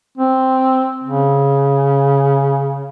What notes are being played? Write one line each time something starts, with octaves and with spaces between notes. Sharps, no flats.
C4
C#3